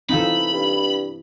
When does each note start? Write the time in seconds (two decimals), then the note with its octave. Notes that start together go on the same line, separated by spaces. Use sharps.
0.09 E3 C4 D#4 F4 A4 B5
0.53 G2